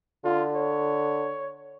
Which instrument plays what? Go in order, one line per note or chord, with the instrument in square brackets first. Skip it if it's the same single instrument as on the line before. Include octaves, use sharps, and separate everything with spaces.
[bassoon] D3 [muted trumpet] F4
[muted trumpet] C#5